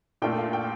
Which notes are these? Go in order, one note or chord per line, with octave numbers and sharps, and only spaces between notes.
A#2 A3 D4 F4 G5
F5
G5